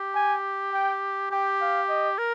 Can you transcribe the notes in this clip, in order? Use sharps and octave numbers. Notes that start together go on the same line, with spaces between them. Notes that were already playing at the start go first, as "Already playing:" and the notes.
Already playing: G4
G#5
G5
G4 G5
F5
D#5
A#4